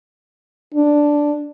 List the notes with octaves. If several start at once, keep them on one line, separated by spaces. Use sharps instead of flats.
D4